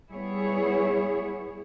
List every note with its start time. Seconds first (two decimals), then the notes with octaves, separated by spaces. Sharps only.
0.11 G3 B3 E4 G#4 C#5